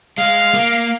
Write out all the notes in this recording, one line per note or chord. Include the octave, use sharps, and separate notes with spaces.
G#3 F5
A#3